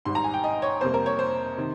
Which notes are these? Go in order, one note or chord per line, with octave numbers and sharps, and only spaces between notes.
G#1 G#2 G3 C6
A#5
G#5
G5
D#5
C#5
F2 C3 G3 A#3 C5
A#4
C#5
C5
C3 D#3